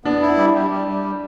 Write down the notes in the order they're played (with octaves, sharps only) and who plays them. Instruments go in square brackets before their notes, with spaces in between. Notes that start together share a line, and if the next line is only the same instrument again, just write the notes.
[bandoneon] B3 [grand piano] D4
[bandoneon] E4
G3
G3
G3
G3